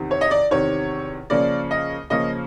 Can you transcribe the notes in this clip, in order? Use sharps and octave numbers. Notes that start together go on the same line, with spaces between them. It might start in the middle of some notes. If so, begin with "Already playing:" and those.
Already playing: E2 C3 D#3
C#5
D#5
D5
E2 C3 D#3 C#5
C#3 F3 A#3 C#4 D5
D#5
C#3 F3 A#3 C#4 D#5